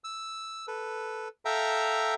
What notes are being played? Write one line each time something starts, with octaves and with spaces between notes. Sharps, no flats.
E6
A4 B4
A4 E5 F5 G5 A#5